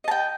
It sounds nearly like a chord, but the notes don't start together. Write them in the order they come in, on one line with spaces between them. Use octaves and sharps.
D#5 A5 G5